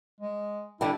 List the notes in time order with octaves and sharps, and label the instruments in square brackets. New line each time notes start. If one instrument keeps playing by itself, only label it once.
[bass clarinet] G#3
[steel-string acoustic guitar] D3 G3 D4 [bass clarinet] E4